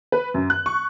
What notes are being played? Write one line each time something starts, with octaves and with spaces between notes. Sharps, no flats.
B4
F#2
F#6
C#6